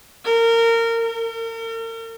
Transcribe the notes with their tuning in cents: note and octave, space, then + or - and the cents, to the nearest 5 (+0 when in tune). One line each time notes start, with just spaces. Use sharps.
A#4 -20
A#4 -40